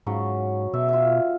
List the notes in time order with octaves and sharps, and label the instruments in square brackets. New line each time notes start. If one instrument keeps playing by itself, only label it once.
[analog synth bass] G#2 [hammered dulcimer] C#3 F#3
[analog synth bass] B2 [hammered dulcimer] E5
[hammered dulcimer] F4 E5